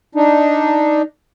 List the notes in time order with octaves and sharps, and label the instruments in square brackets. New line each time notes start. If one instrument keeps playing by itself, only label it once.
[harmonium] D4 D#4